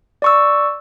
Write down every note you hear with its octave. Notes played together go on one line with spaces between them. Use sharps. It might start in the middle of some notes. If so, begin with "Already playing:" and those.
D5 C#6 E6